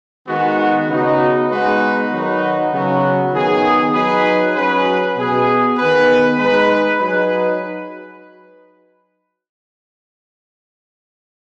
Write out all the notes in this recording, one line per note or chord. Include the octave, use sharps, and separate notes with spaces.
D#3 G#3 B3 F#4
C#3 B3 D#4 F#4
G#3 B3 D#4 F#4 B4
D#3 F#3 D#4 F#4 B4
C#3 F#3 B3 F#4
D#3 B3 G#4
F#3 D#4 G#4 B4
F#3 C#4 G#4 B4
B2 B3 G#4
D#3 B3 G#4 B4
G#3 D#4 B4
F#3 D#4 G#4 B4